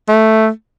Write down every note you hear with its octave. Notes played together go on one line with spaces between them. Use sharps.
A3